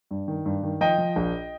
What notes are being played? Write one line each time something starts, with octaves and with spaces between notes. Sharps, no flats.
G2
D#3
G2
D#3
F3 D#5 G5
F3
A#1